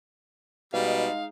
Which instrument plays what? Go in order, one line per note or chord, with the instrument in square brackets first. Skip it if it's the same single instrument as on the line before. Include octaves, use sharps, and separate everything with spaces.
[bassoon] B2 [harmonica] G3 [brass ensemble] G#3 D#4 [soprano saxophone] F5